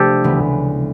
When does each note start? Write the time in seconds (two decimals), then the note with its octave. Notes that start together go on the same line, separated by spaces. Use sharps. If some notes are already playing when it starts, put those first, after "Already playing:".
Already playing: C3 F3 A3 D4 G4 A4
0.24 D2 C#3 E3 G#3 B3